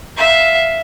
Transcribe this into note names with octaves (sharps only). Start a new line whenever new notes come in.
E5 F5